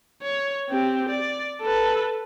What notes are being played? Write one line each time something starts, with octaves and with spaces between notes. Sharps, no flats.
C#5
C4 G4
D5
A4 B4